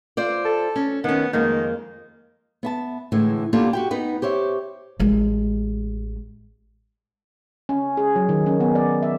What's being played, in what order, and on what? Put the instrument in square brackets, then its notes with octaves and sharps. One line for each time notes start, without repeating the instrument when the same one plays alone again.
[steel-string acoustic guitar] F4 C5 D5
[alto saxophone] A4
[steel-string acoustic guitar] C#4
[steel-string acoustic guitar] D#3 C#4 [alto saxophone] B3
[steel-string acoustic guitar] F2 G#3 A#3 [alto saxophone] D#3
[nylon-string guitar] B3 E5 A5
A2 D3 E3 G#3
A#3 B3 D4 F4 G4 A4
F#4 G4 G5
B3 D#4 B4
G4 C5 C#5 E5
[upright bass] A1 G#3
[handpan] C#4
G#4
F#3
D#3
C#4
B3
D5
E5